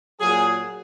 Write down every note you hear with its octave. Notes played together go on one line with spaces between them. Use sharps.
A#2 F#3 G#4